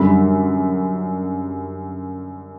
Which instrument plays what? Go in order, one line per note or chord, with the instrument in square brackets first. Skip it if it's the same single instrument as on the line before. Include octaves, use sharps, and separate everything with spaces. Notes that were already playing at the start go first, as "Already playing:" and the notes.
Already playing: [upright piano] F#2 D3 G3 B5